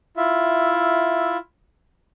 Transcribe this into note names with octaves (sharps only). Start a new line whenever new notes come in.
E4 F4 E5